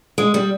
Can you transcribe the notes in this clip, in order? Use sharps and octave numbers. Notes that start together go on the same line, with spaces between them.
G#3
G3